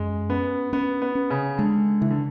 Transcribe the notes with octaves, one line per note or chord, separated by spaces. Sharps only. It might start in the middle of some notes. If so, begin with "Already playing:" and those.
Already playing: F#2 G#3
B3 C#4
B3 C#4
B3
C#4
C#3
D3 G#3
C#3 E3
D3